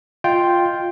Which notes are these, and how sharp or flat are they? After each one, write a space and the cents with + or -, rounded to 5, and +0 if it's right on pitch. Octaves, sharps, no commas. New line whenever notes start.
F4 +0 D#5 +0 G5 +0